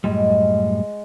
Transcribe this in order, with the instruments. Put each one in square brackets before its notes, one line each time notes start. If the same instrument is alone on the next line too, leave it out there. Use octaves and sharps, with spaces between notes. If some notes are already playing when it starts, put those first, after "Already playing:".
[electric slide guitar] F#2 A2 G3 [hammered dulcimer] G#3